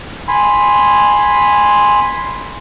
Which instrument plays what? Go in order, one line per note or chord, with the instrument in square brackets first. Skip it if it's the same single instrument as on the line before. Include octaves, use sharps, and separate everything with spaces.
[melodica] G#5 B5 C6